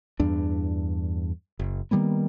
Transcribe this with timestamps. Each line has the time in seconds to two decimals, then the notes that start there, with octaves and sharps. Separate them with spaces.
0.20 E2 G2 D4
1.59 F#1
1.91 D#3 G3 A#3 B3